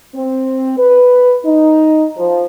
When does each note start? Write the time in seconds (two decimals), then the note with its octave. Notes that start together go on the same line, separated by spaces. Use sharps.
0.14 C4
0.77 B4
1.44 D#4
2.16 F3